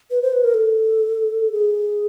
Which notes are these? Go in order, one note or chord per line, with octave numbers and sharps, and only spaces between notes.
B4
C5
B4
A#4
A4
G#4